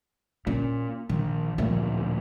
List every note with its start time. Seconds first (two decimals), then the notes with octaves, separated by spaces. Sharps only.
0.47 A#2 C#4
1.09 A#1 D#3
1.58 D1 A#2 F3 A3